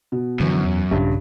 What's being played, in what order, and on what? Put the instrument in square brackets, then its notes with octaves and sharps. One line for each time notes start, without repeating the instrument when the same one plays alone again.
[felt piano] B2
[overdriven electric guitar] F#2 [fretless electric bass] D3 E3 F3
[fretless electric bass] E2
[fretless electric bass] A#1 C#3 [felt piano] G2